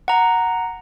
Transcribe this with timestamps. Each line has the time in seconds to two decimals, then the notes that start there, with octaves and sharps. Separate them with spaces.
0.08 F#5 A#5